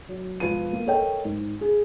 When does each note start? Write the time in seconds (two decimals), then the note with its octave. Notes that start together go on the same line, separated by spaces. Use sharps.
0.09 F#3
0.40 E1 F3 B4 D#7
0.73 A#3
0.87 A4 A#4 C#5 D#5 G5
1.25 G#2
1.61 G#4